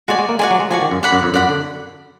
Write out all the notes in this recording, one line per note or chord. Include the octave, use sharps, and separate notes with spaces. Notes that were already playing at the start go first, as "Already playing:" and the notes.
G#3 F#4 D5 G#5
G#3
A#3
G#3 F#4 D5 G#5
F#3
G#3
F3 F#4 D5 G#5
D#3
F#2
D5 F#5 B5
F#2
F2
F#2 D5 F#5 B5
D3